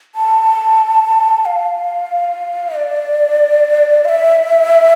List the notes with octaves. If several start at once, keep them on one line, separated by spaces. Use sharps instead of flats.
A5
F5
D5
F5
E5